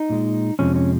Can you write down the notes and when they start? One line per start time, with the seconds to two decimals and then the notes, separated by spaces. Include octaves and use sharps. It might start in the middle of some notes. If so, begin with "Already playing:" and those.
Already playing: D#4
0.10 A#2 G#3
0.59 F2 C3 F3 G#3 C#4
0.76 C#4